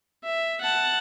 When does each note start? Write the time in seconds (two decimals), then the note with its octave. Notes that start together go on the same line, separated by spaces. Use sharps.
0.24 E5
0.61 F#5 A5